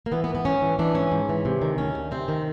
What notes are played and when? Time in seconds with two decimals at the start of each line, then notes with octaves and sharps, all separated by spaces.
0.06 A#3
0.12 E3 B3
0.24 B3
0.29 G#2
0.35 B3
0.45 G#2 C#4
0.62 E3
0.79 E3 D4
0.95 G#2 C#4
1.12 G#2
1.29 E3
1.45 C3
1.62 D#3
1.78 D2 C#4
1.95 D2
2.11 C3 C4
2.28 D#3